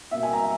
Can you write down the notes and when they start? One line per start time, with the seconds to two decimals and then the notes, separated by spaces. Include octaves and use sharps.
0.11 B2 A#3 E5
0.23 G#5
0.33 A#5